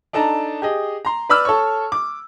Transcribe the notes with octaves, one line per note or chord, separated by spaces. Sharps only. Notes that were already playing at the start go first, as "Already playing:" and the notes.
D4 D#4 A4 A5 A#5
G4 G#4 D#5
A#5 C6
B4 D5 B5 D6 E6 F6
A4 C#5 C#6
D6